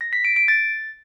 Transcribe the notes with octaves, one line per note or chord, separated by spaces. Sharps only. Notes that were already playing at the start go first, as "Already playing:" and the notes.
A#6
B6
D7
D7
A6